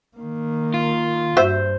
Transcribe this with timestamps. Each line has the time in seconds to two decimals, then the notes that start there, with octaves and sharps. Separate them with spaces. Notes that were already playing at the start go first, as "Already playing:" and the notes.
0.17 D#3 A#3
0.74 F4
1.37 G2 F#4 C5 E5